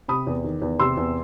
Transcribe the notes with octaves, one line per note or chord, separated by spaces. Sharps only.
C3 B5 D#6
E2
D#3
E2
C3 C6 E6
E2